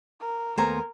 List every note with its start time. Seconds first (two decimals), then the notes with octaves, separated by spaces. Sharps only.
0.20 A#4
0.58 D#2 A3 B3 A#4 C5 G#5 A#5